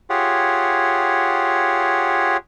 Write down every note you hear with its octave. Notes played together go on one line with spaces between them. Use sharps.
F4 G4 G#4 C#5 F#5